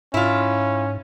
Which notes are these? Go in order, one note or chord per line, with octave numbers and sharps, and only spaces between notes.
G#2 C#4 E4 F4